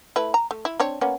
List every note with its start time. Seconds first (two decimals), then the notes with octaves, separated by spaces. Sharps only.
0.16 A3 E4 B4
0.34 A#5
0.51 A3
0.65 E4
0.80 C4 D4 C#5
1.01 A#3 B3 C#4